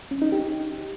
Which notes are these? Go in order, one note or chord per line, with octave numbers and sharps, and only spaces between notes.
C#4
D#4
G4